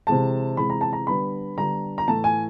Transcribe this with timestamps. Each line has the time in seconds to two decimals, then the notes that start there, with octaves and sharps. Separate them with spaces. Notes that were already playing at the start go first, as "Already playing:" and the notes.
0.07 C3 E3 G#3 A5
0.57 C3 E3 G#3 B5
0.70 A#5
0.81 A5
0.93 A#5
1.07 D3 G3 B3 D4 B5
1.58 D3 G3 B3 D4 A#5
1.98 A#5
2.08 A2 E3 A3 A5
2.24 G#5